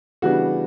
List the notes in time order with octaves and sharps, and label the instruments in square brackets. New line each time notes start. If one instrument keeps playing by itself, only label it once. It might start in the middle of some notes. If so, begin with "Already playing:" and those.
[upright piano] C#3 E3 G3 B3 D4 F#4